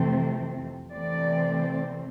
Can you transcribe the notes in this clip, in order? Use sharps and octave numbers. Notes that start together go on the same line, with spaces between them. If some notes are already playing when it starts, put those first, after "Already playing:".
Already playing: F2 C3 E3 A3 C4
C3 E3 A3 C4 D5